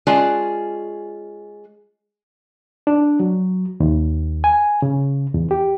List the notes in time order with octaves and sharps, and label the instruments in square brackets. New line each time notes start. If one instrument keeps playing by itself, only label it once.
[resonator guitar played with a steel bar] G#3 C#4 F4 G#4 D5 A5
[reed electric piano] D4
F#3
D#2
G#5
C#3
E2
G4